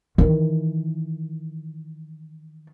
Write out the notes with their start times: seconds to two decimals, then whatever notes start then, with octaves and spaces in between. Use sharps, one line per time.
0.18 D#3 E3